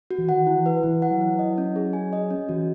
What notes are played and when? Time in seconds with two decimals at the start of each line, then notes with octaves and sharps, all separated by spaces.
0.11 F#4
0.18 E3
0.29 D#3 F#5
0.47 E4
0.56 E3
0.66 B4
0.83 E3 E4
1.02 F#5
1.11 F#3
1.21 E4
1.39 D#5
1.58 C#4
1.76 G#4
1.93 G#5
2.13 D#5
2.30 C#4
2.49 E3 F#4